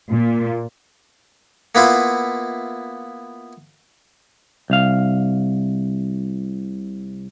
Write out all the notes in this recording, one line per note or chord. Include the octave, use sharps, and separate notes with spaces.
A#2
A#3 B3 E4 F4
C2 F5